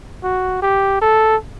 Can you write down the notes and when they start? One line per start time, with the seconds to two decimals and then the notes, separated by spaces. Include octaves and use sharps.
0.23 F#4
0.62 G4
1.01 A4